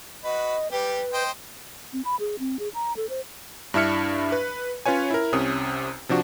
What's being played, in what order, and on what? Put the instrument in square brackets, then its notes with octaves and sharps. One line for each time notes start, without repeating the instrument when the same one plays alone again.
[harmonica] F#4 B4 [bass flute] D#5
[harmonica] G3 G4 [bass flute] B4
[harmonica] C5 D#5 G5
[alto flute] C4
B5
G#4
C4
G#4
A#5
A4
C5
[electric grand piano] G2 D4 E4 E5 F6 C#7
B4
C#4 F4 B4 C#5 G#5
E4 A#4
C2 C3 C#4 D#6
C3 F3 D4 F#4